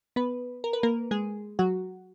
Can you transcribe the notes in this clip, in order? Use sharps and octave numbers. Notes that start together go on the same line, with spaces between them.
B3 B4
A#4
B4
A#3 A#4
G#3 G#4
F#3 F#4